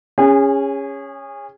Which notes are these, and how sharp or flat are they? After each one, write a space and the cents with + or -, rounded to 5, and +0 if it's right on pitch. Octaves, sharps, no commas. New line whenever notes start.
C#4 +0 G#4 -30